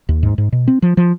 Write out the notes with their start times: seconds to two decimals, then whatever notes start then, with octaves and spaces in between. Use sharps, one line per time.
0.09 D#2
0.23 G#2
0.38 G#2
0.52 B2
0.68 C4
0.82 F3
0.97 F3